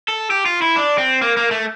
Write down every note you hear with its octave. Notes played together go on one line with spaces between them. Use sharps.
A4
G4
F4
E4
D4
C4
A#3
A#3
A3